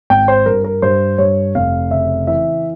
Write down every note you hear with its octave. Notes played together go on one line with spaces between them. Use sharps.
G#1 G5
C5
G2 A#4
A#4
G2 C5
G2 C#5
F1 F5
C#3 E5
E3 E5